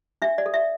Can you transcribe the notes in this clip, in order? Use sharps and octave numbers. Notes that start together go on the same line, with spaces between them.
D4 E5
D5
A4
E5